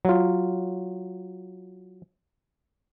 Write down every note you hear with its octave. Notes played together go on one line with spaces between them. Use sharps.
F#3 F4